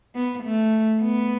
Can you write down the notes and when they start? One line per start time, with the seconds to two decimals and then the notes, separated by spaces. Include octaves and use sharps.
0.15 B3
0.44 A3
1.02 B3